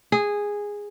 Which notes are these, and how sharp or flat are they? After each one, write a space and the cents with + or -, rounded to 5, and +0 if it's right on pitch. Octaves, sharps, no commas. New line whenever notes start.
G#4 -10